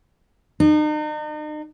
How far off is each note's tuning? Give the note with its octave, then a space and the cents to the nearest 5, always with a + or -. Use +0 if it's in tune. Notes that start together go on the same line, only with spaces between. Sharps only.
D#4 -40